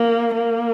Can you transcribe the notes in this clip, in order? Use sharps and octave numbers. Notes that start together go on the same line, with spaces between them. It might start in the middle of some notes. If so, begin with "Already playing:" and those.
Already playing: A#3
A#3